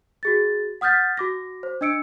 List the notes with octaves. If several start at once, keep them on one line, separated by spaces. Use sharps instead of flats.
F#4 G#4 A6
F#5 D#6 F6 G6 A6 B6
F#4 D6 A#6
C5
D4 D#5 E6 C#7 D7